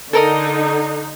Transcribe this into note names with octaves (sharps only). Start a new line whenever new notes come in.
D3 D#4 A4 A#4 D#5